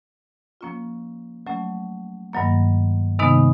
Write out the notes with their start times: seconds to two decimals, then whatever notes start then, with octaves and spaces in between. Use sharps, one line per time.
0.61 F3 A#3 C#4 F4
1.47 F#3 A3 C#4
2.33 G2 D#3 F#3 A#3
3.19 C3 D#3 G#3 B3 D#4